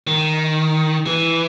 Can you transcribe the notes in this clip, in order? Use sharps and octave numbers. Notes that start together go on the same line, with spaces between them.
D#3
E3